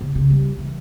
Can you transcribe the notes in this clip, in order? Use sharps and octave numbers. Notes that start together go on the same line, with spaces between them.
C#3
C#3
G3
E3